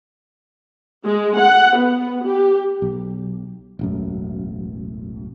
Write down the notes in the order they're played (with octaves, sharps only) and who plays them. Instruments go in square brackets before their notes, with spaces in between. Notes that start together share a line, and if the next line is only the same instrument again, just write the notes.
[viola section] G#3
F#5
B3
G4
[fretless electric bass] B1
E1 A1 F#2